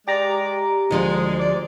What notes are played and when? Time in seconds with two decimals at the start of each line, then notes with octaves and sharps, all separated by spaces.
0.08 G#3 G4 D5 A#5
0.91 D2 F3 G#3 D4
1.39 D5